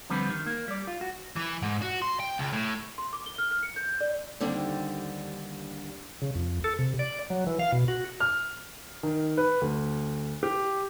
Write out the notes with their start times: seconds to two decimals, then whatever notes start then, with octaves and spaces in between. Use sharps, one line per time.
0.10 F2 D3 G3 B3 C4 B4
0.30 D#3
0.46 A#3
0.68 G3 D5
0.87 F4
1.01 F#4
1.36 E3
1.63 G#2
1.82 F#4
2.02 C6
2.20 G5
2.38 C#2
2.53 A2
2.98 C6
3.13 D6
3.26 G7
3.38 F6
3.51 F6
3.63 C#7
3.76 G6
4.01 D5
4.40 D#2 D3 G3 C4 D4
6.22 C#3
6.35 F2
6.64 A4
6.79 C3
6.99 D5
7.30 F#3
7.47 E3
7.59 F5
7.72 B2
7.88 F#4
8.20 F6
9.03 D#3
9.37 B4
9.61 D2
10.43 G4